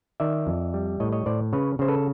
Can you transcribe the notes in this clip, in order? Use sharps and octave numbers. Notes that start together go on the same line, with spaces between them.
D#3 D5 E5
F2
G3
A2 C#5 D#5
C#5 D#5
A2 C5 D5
C#3 B4 C#5
C#3 C5
A4 B4